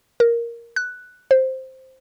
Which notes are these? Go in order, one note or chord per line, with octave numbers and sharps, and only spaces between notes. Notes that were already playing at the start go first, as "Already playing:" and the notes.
A#4
F#6
C5